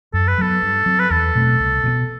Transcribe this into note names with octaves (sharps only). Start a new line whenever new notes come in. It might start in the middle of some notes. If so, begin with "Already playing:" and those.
F#2 A4
B4
F#3 B3 A4
G2
F#3 C4
B4
E2 A4
B2 A3 C4
C2
B2 F#3 B3